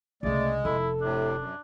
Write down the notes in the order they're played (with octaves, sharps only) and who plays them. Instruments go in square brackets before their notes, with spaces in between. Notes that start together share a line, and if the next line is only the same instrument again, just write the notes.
[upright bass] C2 C#3 [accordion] G#3 [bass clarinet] A3 [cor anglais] D5
[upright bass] F1 [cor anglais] E4 [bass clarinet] A4
[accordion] A2 C3 [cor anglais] D4
[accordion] F#2